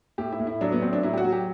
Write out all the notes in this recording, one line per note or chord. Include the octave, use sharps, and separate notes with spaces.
A2 G4
E4
A2
E4
F#3 D4
B3
A2 C4
D4
F#3 E4
G4
F#4
F#3
G4